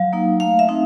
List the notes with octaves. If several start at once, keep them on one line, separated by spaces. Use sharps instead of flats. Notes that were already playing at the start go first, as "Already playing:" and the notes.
Already playing: F#3 F5
A#3 D#4
A3 F5
E5
C4 D#4